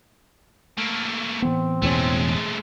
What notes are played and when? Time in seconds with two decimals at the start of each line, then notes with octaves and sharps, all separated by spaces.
0.78 A3 A#3
1.42 A2 E3 B3 C4
1.82 E1 E2 G#3 A3 C#4